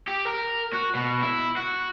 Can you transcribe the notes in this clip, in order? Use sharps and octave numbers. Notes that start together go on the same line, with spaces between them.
G4
A#4
F#4
B2
E4
F#4